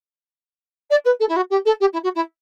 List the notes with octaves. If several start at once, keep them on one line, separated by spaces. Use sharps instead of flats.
D5
B4
A4
E4
F#4
G4
A4
G4
E4
F#4
E4